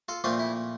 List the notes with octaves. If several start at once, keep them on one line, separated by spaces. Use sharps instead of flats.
F4 A4
A#2 F3 A3 C4 D4 F4
E4